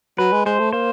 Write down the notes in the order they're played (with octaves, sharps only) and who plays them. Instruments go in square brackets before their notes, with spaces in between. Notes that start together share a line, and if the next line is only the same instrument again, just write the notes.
[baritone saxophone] F#3 [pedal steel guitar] B4
[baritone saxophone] G#3
[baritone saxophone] G#3 [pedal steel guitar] C5
[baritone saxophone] A3
[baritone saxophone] A#3 [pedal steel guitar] C5